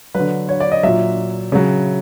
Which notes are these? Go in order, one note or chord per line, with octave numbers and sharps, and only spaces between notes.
F#3 B4
D3
C#5
D5
D#5
A#2 F#3 E5
C#3 F#3